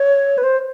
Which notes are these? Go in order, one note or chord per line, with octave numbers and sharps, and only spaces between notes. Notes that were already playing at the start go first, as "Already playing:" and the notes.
Already playing: C#5
B4
C5